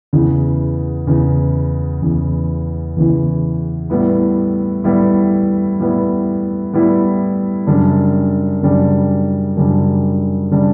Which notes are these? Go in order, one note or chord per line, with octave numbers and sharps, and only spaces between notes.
E2 C#3 E3
E2 C#3 E3
E2 C#3 E3
E2 C#3 E3
A2 G3 B3 E4
A2 G3 B3 E4
A2 G3 B3 E4
A2 G3 B3 E4
F#2 C#3 G3 D4
F#2 C#3 G3 D4
F#2 C#3 G3 D4
C#3 G3 D4